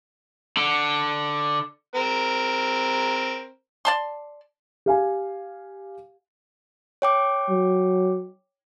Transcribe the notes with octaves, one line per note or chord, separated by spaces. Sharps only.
D3
C4 A#4
D5 A5 C6
G4 F5 G#5
C#5 G5 D6
F#3